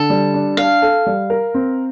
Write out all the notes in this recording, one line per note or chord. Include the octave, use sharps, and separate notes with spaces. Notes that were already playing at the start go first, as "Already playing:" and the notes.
Already playing: D3 A4
G3
D4
D4 F5
A4
G3
A#4
C4